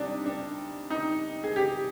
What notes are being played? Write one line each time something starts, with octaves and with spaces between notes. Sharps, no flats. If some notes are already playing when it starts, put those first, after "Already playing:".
Already playing: C3 G3 D4 D#4
D4
D#4
G#4
G4